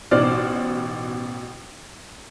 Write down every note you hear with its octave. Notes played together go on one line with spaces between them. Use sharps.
A1 B2 D#4 C5 D5 F6